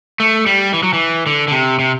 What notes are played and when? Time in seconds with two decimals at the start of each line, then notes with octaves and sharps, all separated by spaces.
0.20 A3
0.46 G3
0.73 E3
0.83 F#3
0.93 E3
1.26 D3
1.48 D3
1.52 C3
1.79 C3